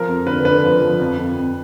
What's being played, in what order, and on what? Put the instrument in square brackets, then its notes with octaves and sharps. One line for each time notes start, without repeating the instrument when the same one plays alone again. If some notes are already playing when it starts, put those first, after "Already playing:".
Already playing: [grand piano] F3 A#4
F2
D3 B4
D3 B4
F3
F3
F2
F2
F2